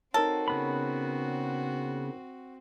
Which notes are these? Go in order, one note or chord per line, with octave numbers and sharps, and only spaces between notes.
C4 D#4 F#4 A4 A#4 C#5
C#3 B3 B5